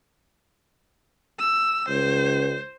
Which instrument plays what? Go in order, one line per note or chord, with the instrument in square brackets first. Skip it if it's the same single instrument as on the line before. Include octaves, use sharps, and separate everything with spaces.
[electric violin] E6
[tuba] C#2 [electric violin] C5